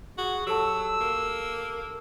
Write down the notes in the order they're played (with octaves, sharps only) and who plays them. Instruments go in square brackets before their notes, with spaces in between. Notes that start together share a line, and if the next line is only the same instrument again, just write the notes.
[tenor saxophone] F#4 [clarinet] G#4
[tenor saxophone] F#3 [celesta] G4 A4 A5 [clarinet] E6
[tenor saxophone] A#3